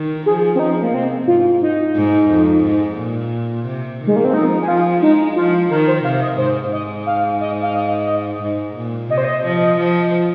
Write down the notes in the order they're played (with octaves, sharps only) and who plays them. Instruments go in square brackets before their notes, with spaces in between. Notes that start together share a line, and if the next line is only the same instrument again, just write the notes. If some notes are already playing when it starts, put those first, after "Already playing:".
Already playing: [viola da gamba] D#3
[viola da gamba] F3 [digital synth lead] G#4
[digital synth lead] C4
[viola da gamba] F3 [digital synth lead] D#4
[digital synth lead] A#3
[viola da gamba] C3 [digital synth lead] C4
[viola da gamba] G#2 [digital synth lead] F4
[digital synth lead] D#4
[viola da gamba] G#2
F2
G#2
A#2
C3
D#3
[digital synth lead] G#3
A#3
C4
[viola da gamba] F3 [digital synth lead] D#4
[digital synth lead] G#4
[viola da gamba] F3 [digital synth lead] F4
[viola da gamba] G#3 [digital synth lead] D#4
[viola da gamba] F3 [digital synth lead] F4
[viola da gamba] D#3 [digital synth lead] A#4
[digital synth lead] C5
[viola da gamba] C3 [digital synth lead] F5
[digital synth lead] D#5
[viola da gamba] G#2 [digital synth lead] C5
[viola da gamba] G#2 [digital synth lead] D#5
[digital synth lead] F5
D#5
F5
D#5
[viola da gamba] G#2
A#2
[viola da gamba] C3 [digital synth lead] D#5
[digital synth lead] C5
D#5
[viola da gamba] F3
F3